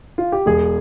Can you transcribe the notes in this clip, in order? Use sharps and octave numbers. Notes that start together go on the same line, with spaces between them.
F4
G4
E1 G#4